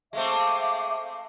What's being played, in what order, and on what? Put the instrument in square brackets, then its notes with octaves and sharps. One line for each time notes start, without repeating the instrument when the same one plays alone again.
[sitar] G#3 A3 C4 [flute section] E5 F5 D6